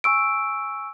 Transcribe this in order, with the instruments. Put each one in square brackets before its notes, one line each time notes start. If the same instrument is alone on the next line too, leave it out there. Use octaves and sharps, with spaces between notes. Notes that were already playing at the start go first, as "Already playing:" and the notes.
[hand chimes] G#5 C#6 E6 D7